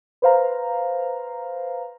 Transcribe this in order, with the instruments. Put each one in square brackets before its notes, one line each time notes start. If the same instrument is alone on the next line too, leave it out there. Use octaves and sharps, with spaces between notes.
[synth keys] B4 C5 F5 A#5